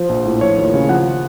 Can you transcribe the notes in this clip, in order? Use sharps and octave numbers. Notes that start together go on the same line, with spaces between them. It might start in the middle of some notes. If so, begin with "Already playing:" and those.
Already playing: F3 C5
A#1
A2
F3 C#5
D#2
C#3
F3 F#5